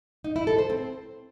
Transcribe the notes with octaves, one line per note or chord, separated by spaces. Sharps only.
D#4
E4
A4
C5
C4